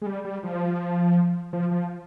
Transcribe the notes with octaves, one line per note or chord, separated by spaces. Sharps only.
G#3
G3
G3
F3
F3
F3